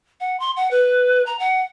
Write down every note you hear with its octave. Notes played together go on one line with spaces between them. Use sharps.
F#5
C6
F#5
B4
A#5
F#5